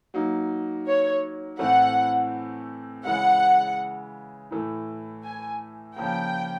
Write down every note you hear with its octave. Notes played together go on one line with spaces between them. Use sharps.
F#3 A#3 D#4
C#5
A2 E3 A3 C4 F#5
C#3 E3 G#3 F#5
A2 E3 A3
G#5
C#3 F3 A#3 G5